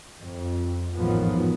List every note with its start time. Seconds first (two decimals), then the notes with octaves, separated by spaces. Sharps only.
0.22 F2
0.97 A1 G#2 D#3 F3 F#3 B3